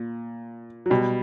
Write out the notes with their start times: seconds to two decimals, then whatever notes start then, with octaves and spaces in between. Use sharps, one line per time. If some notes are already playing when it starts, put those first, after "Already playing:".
Already playing: A#2
0.86 F#3
0.90 B2 G3